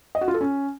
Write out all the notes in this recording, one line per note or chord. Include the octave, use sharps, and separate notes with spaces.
D#5
F#4
F4
A4
C#4